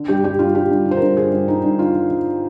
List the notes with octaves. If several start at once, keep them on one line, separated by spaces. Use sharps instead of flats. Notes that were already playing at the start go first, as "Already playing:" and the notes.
Already playing: D3
G2 G4
G2 G4
G2 F4
D3 G4
G2
D3
C5
A#4
G2
D3 G#4
G2
D3 D#4
G2
D3 F4
D3
D3